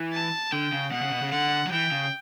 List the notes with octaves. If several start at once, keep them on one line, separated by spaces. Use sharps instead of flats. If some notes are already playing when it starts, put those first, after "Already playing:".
Already playing: E3
A5
D3 G5
C#3
B2 F#5
C#3
B2
C#3
D3 F#5
F#3
E3 G5
C#3